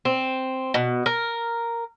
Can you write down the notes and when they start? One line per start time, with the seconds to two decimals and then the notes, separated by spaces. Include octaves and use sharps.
0.05 C4
0.74 B2
1.06 A#4